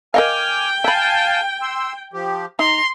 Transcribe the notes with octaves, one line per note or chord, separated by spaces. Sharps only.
A#4 D#5 F5 G5 G#5 D6 F6
E5 F5 G#5 A5 B5
C6 E6
F3 G4
D#4 A#5 C6